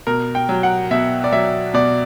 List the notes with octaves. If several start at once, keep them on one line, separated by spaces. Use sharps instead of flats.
B2 A#4
G5
F#3
F#5
B2 E5
D5
F#3 E5
B2 D5